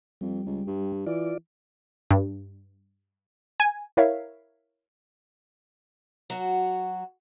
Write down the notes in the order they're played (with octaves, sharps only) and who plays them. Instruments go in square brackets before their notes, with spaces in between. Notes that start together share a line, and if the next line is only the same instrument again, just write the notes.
[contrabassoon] F2 [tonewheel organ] G3
[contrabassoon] C#2
G2
[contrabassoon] E3 [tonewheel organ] F4 D5
[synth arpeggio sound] G2
G#5
E4 A#4 C#5 E5 F5
[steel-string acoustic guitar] F#3 F#4